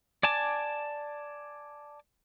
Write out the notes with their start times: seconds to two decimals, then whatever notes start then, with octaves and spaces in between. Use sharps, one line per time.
0.23 D5 G#5 A5 D6